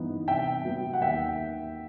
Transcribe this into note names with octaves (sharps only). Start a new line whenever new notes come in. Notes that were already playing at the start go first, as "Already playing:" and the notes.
Already playing: G2 E3 B3 D#4
C3 E5 G5
F#3 B3
F#5
D#2 E5 G5